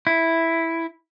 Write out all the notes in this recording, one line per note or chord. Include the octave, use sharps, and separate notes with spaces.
E4